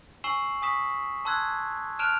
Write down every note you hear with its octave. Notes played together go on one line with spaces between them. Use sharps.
G#5 C#6 E6 C7 E7 F#7
G#5 C#6 D#6 B6 E7
A5 C6 E6 F#6 G#6
A5 F6 F#6 D7 E7 F7